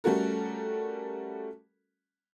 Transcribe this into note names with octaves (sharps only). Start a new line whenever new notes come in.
G3 A3 C#4 F#4 A4 A#4